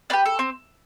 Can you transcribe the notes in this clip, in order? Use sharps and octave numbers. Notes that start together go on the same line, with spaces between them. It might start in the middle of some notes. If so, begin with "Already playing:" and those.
D4 G4 B4
A4
C4